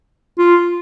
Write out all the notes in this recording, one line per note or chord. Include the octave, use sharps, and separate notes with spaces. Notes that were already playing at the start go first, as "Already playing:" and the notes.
F4